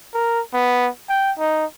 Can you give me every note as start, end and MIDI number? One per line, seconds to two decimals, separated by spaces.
0.14 0.41 70
0.54 0.88 59
1.09 1.32 79
1.39 1.65 63